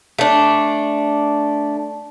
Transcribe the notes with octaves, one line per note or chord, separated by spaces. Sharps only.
A3 D4